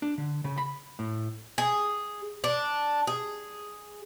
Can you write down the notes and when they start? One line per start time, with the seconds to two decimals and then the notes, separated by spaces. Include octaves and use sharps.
0.02 D4
0.18 D3
0.44 C#3
0.58 B5
0.99 A2
1.58 G#4
2.44 D4
3.07 G#4